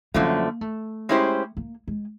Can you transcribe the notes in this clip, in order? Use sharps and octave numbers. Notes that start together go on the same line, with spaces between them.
F#2 D3 F3 A3 A#3
A3
G#3 C#4 E4 G4 C5
A#3
G#3